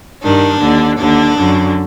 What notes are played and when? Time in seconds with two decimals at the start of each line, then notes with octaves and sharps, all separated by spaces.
0.23 G2 D#3 D4
0.61 D#2 D3
0.99 D#2 D3 D4
1.38 F#2 D3